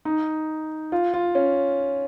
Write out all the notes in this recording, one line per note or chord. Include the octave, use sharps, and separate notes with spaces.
D#4
F4
F4
C#4